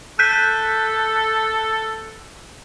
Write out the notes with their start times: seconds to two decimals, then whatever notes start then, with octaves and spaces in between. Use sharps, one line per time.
0.19 A4 F#6 G6 B6